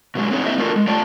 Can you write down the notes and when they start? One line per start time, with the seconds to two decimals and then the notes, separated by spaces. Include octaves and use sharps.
0.15 B2 F#3 G#3
0.31 B3 C4 D4 D#4 G#4 C#5
0.46 A#3 C4 E4 C5 D#5 E5
0.58 A3 B3 D4 F4 F#4 A#4
0.76 G#3
0.87 A3 F4 C#5 D5 G5 A5